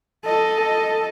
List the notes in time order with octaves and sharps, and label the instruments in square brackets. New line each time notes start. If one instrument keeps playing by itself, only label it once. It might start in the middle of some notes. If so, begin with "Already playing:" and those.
[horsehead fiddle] A4 D#5